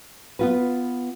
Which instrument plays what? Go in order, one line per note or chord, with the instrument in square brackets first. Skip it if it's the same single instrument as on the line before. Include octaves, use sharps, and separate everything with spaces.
[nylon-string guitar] B3 F4 B4